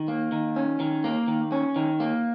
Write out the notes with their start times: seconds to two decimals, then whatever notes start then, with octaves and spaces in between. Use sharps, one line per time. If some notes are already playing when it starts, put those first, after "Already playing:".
Already playing: D#3
0.08 A#3
0.32 D#3
0.56 C#4
0.80 D#3
1.04 A#3
1.28 D#3
1.52 C#4
1.76 D#3
2.00 A#3